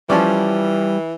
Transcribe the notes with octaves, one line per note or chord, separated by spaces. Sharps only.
E3 F3 G3 C#4 D5